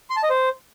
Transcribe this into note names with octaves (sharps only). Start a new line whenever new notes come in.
C6
A5
D#5
C5